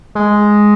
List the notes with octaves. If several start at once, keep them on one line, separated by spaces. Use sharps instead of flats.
G#3